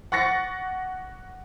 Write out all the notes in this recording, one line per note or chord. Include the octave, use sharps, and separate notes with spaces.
F#5 C#6 A6 A#6 C#7